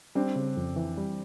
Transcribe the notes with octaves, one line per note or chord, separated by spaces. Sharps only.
G3 C4 D4
C#3
F2
E3
G3